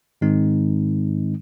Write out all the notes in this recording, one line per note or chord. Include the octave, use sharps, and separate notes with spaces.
G#2 D#3 G#3 C4 D#4